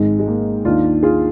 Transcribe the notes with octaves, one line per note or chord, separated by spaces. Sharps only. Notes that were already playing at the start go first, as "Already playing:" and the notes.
Already playing: G#1 G#2 D#3 G#3 C4
G#3
A#3
D#2 D#3 D4 F4
F4 G#4